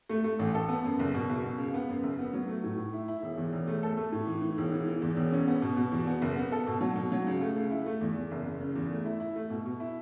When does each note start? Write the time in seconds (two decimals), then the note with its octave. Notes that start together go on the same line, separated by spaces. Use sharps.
0.10 A3
0.24 A3
0.39 A1
0.55 A4
0.69 B3
0.85 F#2
0.99 F#1
1.14 B2
1.29 F#1
1.43 B2
1.58 C#2
1.74 B3
1.89 F#2
2.03 F#1
2.19 B3
2.33 F#3
2.48 A3
2.64 A2
2.77 A2
2.93 E4
3.08 E4
3.22 E1
3.38 E2
3.53 E1
3.68 A3
3.83 A4
3.97 A3
4.12 A2
4.27 E3
4.42 E3
4.58 E1
4.72 E3
4.88 E3
5.02 E2
5.16 E1
5.31 C#4
5.47 B3
5.62 B2
5.77 B2
5.92 E2
6.07 B3
6.22 F#1
6.36 B3
6.52 A4
6.67 B2
6.81 F#3
6.96 B2
7.12 F#3
7.27 C#2
7.41 A3
7.56 C#2
7.71 E4
7.86 A3
8.01 E2
8.15 E2
8.31 F#1
8.46 F#1
8.60 C#3
8.76 E2
8.90 A3
9.05 E4
9.20 E4
9.36 A3
9.50 B2
9.66 B2
9.80 E4